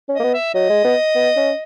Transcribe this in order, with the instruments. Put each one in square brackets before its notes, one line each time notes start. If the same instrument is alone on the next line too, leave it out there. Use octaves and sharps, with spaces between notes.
[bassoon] C#4
[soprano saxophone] D#5
[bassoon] A#3
B3
[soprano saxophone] E5
[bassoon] F#3 [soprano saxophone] D#5
[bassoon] G#3
B3
B3
C#4